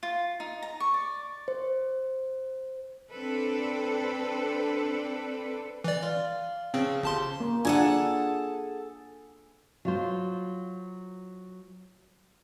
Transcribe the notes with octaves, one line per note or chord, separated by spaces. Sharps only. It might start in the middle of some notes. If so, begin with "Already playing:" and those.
F4
D#4
A#5
C#6
D5
C5
C4 D4 A4 B4
E3 D5
F4
C#3 F3 C4
G1 G4 A5 C6
A#3
D4 F4 G#4 A4 F#5 G#5
F#3 F4 C5